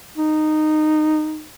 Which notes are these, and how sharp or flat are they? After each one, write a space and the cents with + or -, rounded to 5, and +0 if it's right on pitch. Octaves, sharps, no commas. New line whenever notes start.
D#4 -15